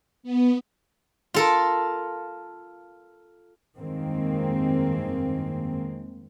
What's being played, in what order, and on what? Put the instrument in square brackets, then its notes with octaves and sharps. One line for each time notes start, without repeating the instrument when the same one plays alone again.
[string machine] B3
[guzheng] F4 A4 A#4
[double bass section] F1 G2 D#3 G#3 A#3 C4